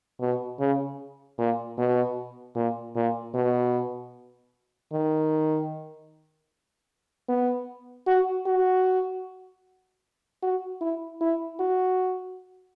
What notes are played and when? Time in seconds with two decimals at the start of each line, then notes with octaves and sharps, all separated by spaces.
0.21 B2
0.60 C#3
1.38 A#2
1.78 B2
2.55 A#2
2.96 A#2
3.35 B2
4.92 D#3
7.28 B3
8.07 F#4
8.46 F#4
10.43 F#4
10.81 E4
11.21 E4
11.60 F#4